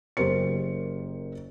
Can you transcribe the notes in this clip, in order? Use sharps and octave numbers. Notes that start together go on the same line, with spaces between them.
F#1 G4 A#4 C5 C#7